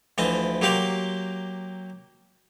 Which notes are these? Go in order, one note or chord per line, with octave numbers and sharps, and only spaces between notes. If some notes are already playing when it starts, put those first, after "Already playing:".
D2 E3 F3 D#5
F#3 A#3 G4 F5 C6